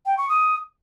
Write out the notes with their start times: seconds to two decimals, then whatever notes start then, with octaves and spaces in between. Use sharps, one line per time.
0.06 G5
0.18 C#6
0.29 D#6